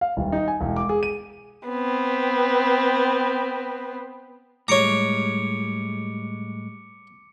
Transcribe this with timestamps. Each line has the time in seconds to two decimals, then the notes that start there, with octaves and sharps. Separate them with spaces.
0.01 F5
0.17 D#1
0.32 D#4
0.48 G#5
0.61 E1
0.76 D6
0.89 G#4
1.03 D#7
1.68 B3 C4
4.68 A2 G3 G#3 C#5 A#5 D6 C#7 D7